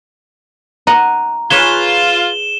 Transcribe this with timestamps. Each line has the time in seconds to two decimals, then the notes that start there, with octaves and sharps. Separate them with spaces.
0.87 D#5 F#5 A#5
1.50 F4 G#4 B4 C#5 E7 G7